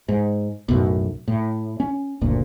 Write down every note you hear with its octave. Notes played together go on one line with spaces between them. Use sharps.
G#2
B1 F#2 A2
A2
C#4
F#1 D2 A#2